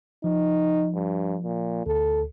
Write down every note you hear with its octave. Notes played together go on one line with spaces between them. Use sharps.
F3 D#4
G2
A#2
D2 A4